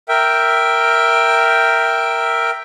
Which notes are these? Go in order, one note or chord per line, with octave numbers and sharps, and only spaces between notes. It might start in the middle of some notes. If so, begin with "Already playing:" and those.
A#4 E5 G5